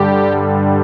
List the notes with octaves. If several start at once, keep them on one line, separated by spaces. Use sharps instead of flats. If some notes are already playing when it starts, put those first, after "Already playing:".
Already playing: G2 D3 G3 G4